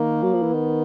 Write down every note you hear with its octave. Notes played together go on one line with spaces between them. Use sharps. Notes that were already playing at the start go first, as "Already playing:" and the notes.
Already playing: D#3 A#3
F#3
F3
E3
D#3 B3